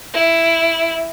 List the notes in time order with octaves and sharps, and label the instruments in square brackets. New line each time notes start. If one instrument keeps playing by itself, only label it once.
[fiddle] E4